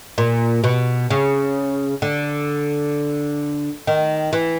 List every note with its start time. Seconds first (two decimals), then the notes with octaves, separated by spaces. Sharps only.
0.18 A#2
0.64 B2
1.10 C#3
2.02 D3
3.87 D#3
4.33 E3